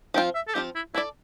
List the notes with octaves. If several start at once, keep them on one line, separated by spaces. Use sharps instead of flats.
F3 C4 F4 G5
E5
A4
F3 C4 F4 G4
E4
D4 E4 A4 D5